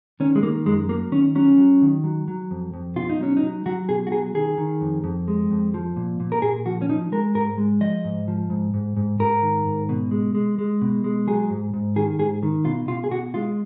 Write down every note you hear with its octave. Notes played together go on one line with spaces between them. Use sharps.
D#3 C#4
G#3
D#3 A#3
F#2 G#3
F#3 A#3
D#3 C#4
F#3 C#4
F#3
D#3
F#3
F#3
F2
F2
B2 F4
D#4
F#3 C#4
D#4
F#3
F#3 F#4
B2 G#4
F#4
F#3 G#4
D#3 G#4
D#3
F2
F2
G#3
F2
F3
A#2
A#2
A#4
A#2 G#4
F3 F#4
C#4
F3 D#4
G#3 A#4
G#2 A#4
G#3
F3 D#5
G#2
F3
G#2
G#2
G#2
G#2 A#4
D#3
G#2
B2
G#3
G#3
G#3
B2
G#3
F#3 G#4
G#2
G#2
D#3 G#4
G#2 G#4
D#3
B2 F4
B2 F4
G#4
B2 F#4
G#3 F4